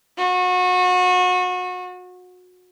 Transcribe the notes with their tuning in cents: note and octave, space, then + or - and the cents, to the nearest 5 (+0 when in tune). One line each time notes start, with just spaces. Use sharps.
F#4 -30